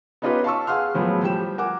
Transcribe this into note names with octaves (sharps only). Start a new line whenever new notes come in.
B3 C#4 D#4 F4 G4 B4
F5 A5 C#6 E6
G#4 F5 F#5 C6 F6
A2 F3 F#3 G#3 A3 B3
F3 G3 G5 E7
A#4 F#5 G#5 D6